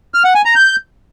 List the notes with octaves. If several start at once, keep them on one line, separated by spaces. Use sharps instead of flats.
F6
F#5
G#5
A#5
G6